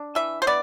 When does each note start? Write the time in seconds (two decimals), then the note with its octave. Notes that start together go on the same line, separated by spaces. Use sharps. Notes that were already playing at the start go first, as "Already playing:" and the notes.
Already playing: D4
0.15 E3 E5
0.42 C5
0.47 B3 D5